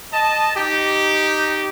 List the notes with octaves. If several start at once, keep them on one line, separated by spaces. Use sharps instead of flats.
D#5 A5
D#4 G4